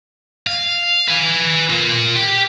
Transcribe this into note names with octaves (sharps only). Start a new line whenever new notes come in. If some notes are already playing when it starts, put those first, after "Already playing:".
F5
B4 G#5
F4 A#4
G4